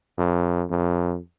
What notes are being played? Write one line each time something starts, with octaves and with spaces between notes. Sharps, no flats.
F2
F2